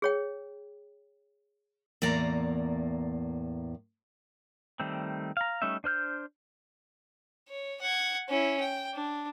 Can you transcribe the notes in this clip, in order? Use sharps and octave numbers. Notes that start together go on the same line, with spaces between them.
G#4 C#5 G5
E2 A2 A#3 D5 A#5
D#3 G3 A3 C4
F5 A#5
G3 A3 C#4 D#4 E5
D4 C5 F6 G6
C#5
F#5 G#6
C#4 E4
G5
D4